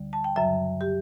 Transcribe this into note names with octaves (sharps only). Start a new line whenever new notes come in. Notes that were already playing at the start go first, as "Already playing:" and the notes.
Already playing: D2 D3 G3
A5
G5
F#2 C#3 F#3 E5
G4